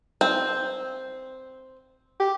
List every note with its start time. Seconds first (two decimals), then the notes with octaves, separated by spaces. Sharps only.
0.21 C4
2.20 G4